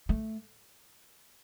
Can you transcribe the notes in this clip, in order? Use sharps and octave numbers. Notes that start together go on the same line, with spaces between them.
A3